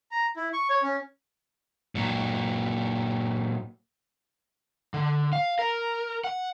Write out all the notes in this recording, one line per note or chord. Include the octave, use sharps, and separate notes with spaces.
A#5
E4
C#6
C#5
C#4
A#2 F#3
D3
F5
A#4
F#5